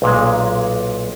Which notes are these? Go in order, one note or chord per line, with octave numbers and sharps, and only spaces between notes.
B1 A#2 G#3